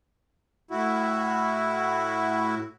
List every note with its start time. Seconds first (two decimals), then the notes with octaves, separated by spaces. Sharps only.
0.71 A2 E4 F#4